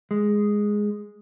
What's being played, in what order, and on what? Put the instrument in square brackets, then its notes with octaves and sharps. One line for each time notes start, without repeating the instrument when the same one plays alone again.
[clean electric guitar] G#3